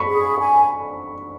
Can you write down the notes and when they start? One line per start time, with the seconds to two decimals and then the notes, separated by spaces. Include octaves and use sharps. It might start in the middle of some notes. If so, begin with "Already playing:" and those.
Already playing: B5 C#6
0.08 G#4
0.39 G#5